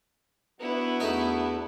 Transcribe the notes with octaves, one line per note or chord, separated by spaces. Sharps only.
B3 D4 E4 F#4
E2 A3 D#4